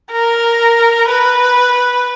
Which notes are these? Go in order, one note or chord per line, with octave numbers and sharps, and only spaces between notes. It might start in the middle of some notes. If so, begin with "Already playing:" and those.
A#4
B4